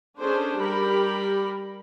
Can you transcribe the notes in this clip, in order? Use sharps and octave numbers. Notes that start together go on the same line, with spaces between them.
C#4 D4 G#4 A4 C5
G3 G4 A#4 B5